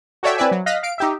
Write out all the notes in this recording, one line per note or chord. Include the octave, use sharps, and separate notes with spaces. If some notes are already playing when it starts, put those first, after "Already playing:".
F#4 A4 C#5 D5 E5 G5
C4 E4 B4 D5 E5 G#5
F#3
D#5 F5 F#6 A#6 B6
F5 D7
D#4 G4 E5